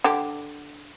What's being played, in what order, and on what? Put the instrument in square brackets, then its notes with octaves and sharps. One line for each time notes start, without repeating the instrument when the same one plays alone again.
[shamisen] D3 G4